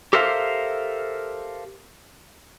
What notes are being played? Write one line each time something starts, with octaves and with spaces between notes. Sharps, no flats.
G4 A4 A#4 C5 E5 F5